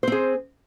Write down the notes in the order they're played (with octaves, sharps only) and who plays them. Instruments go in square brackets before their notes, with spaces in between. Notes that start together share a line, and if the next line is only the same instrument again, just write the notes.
[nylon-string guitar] C5
C4
G#4